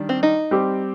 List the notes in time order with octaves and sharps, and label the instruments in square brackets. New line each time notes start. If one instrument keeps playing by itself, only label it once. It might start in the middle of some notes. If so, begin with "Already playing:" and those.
Already playing: [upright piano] D#3 G3 D4
[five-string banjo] C4
D#4
[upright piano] G3 C4 G4